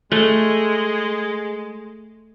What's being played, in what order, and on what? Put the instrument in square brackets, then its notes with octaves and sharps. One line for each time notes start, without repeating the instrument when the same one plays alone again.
[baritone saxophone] G#3 [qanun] A3